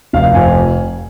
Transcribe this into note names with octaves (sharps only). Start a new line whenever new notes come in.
F1 F5
F2 G#5